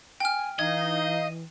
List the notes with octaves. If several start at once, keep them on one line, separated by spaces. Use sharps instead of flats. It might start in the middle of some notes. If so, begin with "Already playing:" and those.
G5 G#5 F6
E3 D#4 D#5 F5 G#6